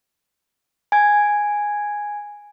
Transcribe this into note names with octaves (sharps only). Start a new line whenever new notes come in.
G#5 G#6